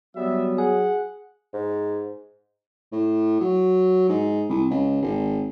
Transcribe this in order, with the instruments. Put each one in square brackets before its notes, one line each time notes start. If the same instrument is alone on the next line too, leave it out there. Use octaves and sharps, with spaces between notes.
[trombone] F#3 [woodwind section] G3 B3 [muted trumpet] E5
[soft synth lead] G#4 [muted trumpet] F#5
[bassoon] G#2
[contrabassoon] A2
F#3
G#2
C2
C#2
G#1